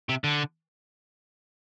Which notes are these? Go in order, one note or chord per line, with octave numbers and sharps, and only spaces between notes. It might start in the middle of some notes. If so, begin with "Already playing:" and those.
C3
D3